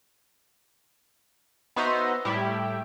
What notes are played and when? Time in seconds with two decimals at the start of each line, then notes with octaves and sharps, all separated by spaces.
1.76 B3 D#4 F#4 C5 E5 A#5
2.25 A2 G3 E4 G4